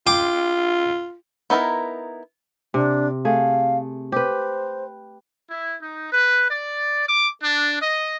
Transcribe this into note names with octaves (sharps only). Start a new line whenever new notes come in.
F4 G5 C6 D6
B3 D#4 E4 G#4 A#4
C3 D4
A3 G#4 F5
G4 B4 C5
E4
D#4
B4
D5
D6
D4
D#5